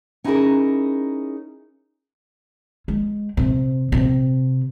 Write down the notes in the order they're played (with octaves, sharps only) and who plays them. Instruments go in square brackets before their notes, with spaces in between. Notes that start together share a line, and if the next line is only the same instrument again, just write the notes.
[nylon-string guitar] C#4 D#4 E4 G4 G#4 A#4
[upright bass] G#3
C3
C3